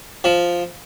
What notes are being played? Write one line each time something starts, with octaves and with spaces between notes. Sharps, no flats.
F3